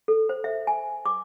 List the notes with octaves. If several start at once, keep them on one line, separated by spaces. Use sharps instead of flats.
A4
C5
E5
G#5
D6